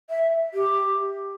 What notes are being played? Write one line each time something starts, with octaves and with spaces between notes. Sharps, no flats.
E5
G4